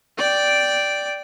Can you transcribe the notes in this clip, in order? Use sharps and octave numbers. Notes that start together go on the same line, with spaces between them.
D5 G5